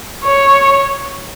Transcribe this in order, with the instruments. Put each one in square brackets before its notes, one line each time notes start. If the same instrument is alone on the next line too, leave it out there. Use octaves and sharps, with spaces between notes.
[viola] C#5